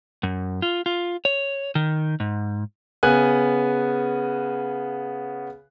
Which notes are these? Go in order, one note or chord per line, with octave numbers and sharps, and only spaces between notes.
F#2
F4
F4
C#5
D#3
G#2
C#3 B3 G#5 F#6